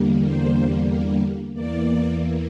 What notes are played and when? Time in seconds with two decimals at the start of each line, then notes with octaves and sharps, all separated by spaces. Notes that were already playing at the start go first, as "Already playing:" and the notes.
Already playing: E2 D3 G3 A#3
0.24 C5
1.54 E2 E3 A#3 D5